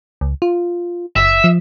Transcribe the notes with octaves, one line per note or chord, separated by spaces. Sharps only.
C#2
F4
F#1 E5
F3